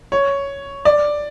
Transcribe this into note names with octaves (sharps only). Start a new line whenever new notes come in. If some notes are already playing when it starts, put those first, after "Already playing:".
C#5
D5